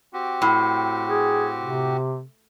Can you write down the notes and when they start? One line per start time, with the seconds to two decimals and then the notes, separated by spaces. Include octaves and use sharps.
0.13 C4 F#4 G4
0.42 A2
1.09 G#4
1.63 C3